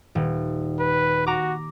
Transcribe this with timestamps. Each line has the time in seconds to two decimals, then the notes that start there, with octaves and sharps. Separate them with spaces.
0.15 D#1
0.79 B4
1.27 F#4 A#5 D6